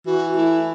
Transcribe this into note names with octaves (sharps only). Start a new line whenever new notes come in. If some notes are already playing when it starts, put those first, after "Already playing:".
E3 F#4
A3 E4